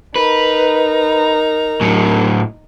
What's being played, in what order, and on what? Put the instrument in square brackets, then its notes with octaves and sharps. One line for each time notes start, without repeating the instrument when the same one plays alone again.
[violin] D#4 A#5 [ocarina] A#4 [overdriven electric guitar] B4
[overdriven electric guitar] A2 F#3